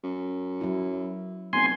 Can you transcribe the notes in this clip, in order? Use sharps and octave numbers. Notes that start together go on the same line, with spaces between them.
F#2
F#3 E4
F1 B3 G#5 C6